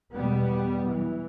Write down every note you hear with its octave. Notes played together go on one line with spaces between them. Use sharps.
E2 B2 G3 B3
E3